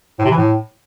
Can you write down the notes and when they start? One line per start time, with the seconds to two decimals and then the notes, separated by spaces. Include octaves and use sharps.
0.19 A2
0.25 C3
0.30 E3
0.36 A2